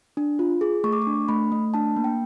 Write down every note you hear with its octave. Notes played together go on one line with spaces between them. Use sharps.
D4
F4
G#4
A3 C#6
D6
C#6
D4
A3 B5
A3
D4 A5
A#3
G5